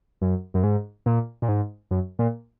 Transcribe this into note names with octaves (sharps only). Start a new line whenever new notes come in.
F#2
F#2
G#2
A#2
A#2
G#2
F#2
A#2